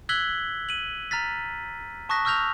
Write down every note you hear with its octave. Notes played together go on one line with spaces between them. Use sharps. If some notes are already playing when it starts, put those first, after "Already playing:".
E6 F#6 G#6 B6 F#7 G7
D#7 F#7
A#5 F6 A6 B6
A5 C#6 D#6 F#6 A#6 B6
C#6 E6 F6 G6 A#6 F7